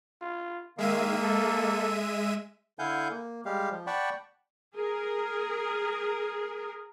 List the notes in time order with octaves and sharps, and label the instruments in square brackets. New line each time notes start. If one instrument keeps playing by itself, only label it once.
[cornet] F4
[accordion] D#3 F5 [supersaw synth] G#3 E5 D#7 [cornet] A#3
[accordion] A4
[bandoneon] D3 E4 F5 F#5 G#5 G6
A#3
G3 G#3 G4 F5
F3
D5 F#5 G5 A5 B5 C#6
[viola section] G#4 A#4